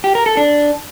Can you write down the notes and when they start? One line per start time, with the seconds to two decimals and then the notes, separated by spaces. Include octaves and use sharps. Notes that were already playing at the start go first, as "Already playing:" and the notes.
0.04 G4
0.15 A#4
0.26 A4
0.37 D4